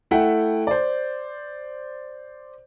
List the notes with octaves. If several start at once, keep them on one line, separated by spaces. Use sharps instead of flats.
A3 E4 F#5 G5
C5 D5